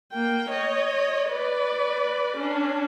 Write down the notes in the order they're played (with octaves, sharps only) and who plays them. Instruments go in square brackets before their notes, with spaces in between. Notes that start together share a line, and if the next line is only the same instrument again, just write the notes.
[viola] A#3 G5
C#5 D#5
B4 D5
C#4 D4